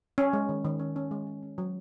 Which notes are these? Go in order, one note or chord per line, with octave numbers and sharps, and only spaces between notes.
C#4
G#3
D#3
D#3
C#4
C#4
G#3
G#3
C#4
F#3